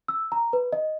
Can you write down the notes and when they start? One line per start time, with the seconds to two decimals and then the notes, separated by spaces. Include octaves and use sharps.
0.08 E6
0.32 A#5
0.53 B4
0.73 D#5